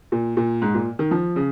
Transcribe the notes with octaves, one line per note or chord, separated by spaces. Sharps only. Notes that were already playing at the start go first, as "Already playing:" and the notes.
A#2
A#2
G#2
A#2
D#3
F3
C#3